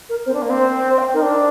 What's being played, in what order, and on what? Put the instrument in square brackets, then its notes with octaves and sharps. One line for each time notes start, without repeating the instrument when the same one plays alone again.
[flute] A#4
[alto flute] C4 [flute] C5
[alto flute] D4
A#3
C4
[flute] C5
C5
G5
[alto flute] D#4 [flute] A#4
[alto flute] D4